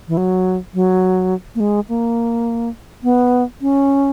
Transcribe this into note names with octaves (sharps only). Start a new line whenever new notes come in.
E3
F#3
F#3
A#3
G#3
A#3
B3
C#4